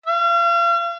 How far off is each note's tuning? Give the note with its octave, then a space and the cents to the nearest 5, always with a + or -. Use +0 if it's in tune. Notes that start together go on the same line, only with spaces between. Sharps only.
F5 -40